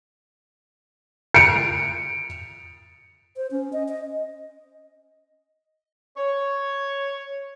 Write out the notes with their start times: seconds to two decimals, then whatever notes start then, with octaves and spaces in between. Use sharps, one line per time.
1.34 C#7 D7
3.37 C5
3.51 C#4
3.73 D#5
3.88 D#5
6.17 C#5